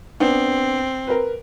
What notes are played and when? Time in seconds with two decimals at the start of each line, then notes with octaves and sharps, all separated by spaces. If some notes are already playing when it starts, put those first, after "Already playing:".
0.20 B3 C4 D4
1.07 A#4 B4